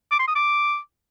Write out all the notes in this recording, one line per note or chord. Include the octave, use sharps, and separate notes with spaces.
D6
C6
D#6
D6